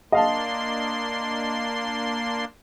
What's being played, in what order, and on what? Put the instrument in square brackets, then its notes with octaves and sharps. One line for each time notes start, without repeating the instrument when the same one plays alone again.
[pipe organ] A#3 D4 C6 [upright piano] D#5 F5 A5